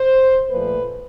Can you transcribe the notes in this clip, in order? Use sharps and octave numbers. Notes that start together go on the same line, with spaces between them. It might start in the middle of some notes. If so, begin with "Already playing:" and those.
Already playing: C5
A#2 F3 A3 B4